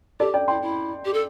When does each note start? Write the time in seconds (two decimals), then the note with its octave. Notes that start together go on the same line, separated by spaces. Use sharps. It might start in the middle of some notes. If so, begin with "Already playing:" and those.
0.20 G4 A4 D5
0.34 D5 G5
0.48 E4 G5 C6
0.62 E4
1.05 G4
1.13 A4